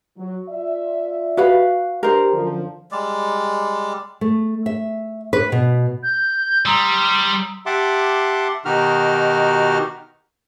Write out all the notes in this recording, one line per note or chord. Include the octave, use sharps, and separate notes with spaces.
F#3
F4 D5 E5
F#4 B4 F5
D4 G4 A#4 C5
F#2 D3 F3
G3 G#3 D5
A3
E5
B4
B2
G6
G3 A#5 C6 D#6 E6
G4 E5 F#5 A5 C6 D6
B2 D#3 D#4 F#4 G4 F6